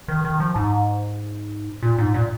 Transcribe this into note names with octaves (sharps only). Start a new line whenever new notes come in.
D#3
D#3
F3
G#2
A#2
G#2
A#2